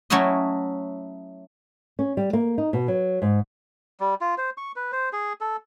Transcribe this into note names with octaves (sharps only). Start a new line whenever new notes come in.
F#3 A3 C#4 E4 F#4 D#5
C#4
G3
A#3
D#4
B2
F#3
G#2
G3
F4
C5
C#6
B4
C5
G#4
A4